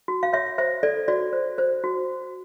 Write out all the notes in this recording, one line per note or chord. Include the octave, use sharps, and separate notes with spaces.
F#4
F5
C#5 E5
C5 E5
A4 D5
F#4 D5
C5
C5
F#4